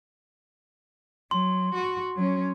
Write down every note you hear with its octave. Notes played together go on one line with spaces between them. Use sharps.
F#3 C6
F#4
F#3 C#4